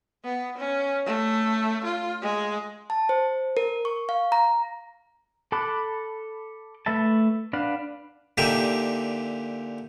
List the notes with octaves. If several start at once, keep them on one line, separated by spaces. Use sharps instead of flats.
B3
C#4
A3
F4
G#3
A5
C5
A#4
C#6
F5
A#5
A4 A5 B5 D6 F#6
A3 B4 E5 A5
D4 B4 F5 F#5
A#2 D3 D#4 G4 E5